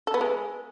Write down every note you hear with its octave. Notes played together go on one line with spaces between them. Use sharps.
A4
B3
G#3